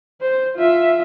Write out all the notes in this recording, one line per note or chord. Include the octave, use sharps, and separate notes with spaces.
C5
F4 E5